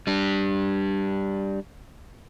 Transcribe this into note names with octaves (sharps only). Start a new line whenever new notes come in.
G3 D4